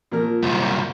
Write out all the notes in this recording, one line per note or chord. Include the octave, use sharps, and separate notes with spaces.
A#2 F3 A#4
C2 F#2